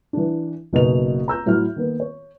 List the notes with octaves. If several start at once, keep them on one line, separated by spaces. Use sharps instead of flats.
E3 D4
F#1 B2 D#4 F7
A#5 E6 G6
A2 F#3 E4 F#4 F6
D#3 A#3 B3
C#5